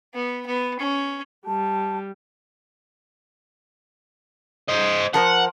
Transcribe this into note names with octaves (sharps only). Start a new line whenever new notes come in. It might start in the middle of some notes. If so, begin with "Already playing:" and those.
B3
B3
C#4
G3 A5
C5 D#5
F3 A#4 C5 F#5